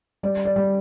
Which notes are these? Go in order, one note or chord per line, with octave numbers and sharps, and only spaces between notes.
G3 D5
D5
G3